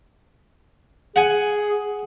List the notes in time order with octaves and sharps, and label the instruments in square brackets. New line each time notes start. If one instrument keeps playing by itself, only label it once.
[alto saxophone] G#4 [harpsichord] F#5 G#5